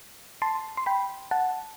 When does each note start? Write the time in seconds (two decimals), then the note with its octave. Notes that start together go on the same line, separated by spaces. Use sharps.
0.42 A5 C6
0.77 C6
0.86 G5 B5
1.31 F#5 A5